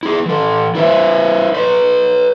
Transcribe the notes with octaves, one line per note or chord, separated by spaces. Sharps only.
E4 G#4
E3 A4
E4 B4 C5 E5
B4 C#5